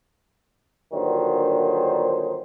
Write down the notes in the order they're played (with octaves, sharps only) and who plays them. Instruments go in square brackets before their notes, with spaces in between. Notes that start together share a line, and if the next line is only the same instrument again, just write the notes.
[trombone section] G2 A#2 D3 D#3 F#3 C5